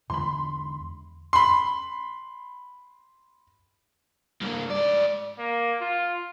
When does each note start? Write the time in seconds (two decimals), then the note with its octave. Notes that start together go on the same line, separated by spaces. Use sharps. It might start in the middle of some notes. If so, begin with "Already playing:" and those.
0.10 E2 D3 G#3 B5 C6
1.33 B5 C6
4.41 G2 A#3
4.70 G#2 D5
5.39 A#3
5.81 F4